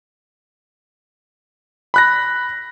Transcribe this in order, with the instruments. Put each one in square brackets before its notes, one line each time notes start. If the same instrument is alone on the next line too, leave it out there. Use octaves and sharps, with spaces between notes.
[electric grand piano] B5 F#6 A#6